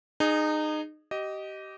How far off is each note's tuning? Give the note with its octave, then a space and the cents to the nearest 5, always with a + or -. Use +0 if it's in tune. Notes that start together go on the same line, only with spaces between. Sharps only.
D#4 -25 G#4 +0
G4 -25 D#5 +0